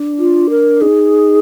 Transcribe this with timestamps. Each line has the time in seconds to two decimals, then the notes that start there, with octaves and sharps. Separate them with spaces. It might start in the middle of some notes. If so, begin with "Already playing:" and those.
Already playing: D4
0.19 F4
0.50 A#4
0.81 D#4 G#4